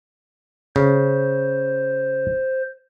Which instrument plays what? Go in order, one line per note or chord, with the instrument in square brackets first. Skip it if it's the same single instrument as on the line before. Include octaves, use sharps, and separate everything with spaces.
[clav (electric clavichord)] C#3 [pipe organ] C5